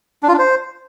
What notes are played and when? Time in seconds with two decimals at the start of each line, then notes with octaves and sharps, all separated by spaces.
0.23 D4
0.28 F4
0.33 D4
0.39 C5